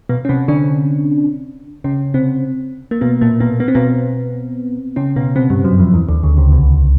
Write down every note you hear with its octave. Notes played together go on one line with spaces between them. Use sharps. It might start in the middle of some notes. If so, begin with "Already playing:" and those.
B2 B3
C#4
C3 C4
D3 D4
C#3 C#4
C3 C4
A#3
B2 B3
A#2 A#3
B2 B3
B3
C4
B2 B3
C#3 C#4
B2 B3
C3 C4
G2 G3
F#2 F#3
F2 F3
E2 E3
D#2 D#3
D2 D3
C#2 C#3
C2 C3